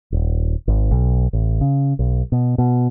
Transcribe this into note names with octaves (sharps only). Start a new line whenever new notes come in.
D#1
G#1
B1
A1
C#3
B1
B2
B2